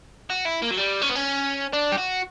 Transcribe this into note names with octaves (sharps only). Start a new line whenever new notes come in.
F#4
E4
A#3
F#3
G3
C#4
B3
C#4
D4
G4
F#4